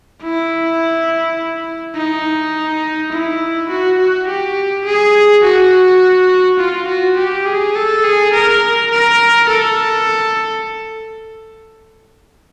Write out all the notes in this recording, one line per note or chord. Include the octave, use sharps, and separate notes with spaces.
E4
D#4
E4
F#4
F#4
G4
G#4
F#4
F4
F#4
G4
G#4
A4
G#4
A#4
A#4
A4